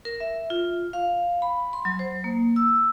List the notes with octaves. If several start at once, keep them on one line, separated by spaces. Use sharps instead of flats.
A#4
E5
F4
F5
B5
C6
F#3
C5
A#3
E6